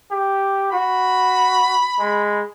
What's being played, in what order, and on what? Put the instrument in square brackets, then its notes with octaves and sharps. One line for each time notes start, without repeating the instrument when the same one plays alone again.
[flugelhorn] G4
[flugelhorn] F#4 [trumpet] B5
[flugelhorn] G#3